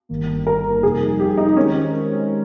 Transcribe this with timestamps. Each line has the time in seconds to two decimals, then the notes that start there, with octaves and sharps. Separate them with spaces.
0.09 G1 G2 D#3 A#3
0.47 A#4
0.83 F2 C3 G3 A#3 D#4 G#4
1.20 G4
1.38 D#4
1.56 D#3 G#3 C4 C#4 G4 A#4